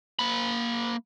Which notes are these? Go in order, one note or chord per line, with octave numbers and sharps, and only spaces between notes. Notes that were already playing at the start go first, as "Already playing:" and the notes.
A#3 B5